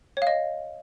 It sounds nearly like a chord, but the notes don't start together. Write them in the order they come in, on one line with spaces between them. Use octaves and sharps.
C#5 F5 D#5